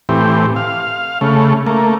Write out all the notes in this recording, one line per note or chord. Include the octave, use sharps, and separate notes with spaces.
A2 E3 C4 G4
F5
C#3 A3
A3 A#3